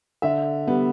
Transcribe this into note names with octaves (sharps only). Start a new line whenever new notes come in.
D3 E5
G3 B3